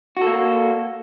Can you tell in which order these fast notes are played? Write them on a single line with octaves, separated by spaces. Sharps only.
F#4 A4 A#3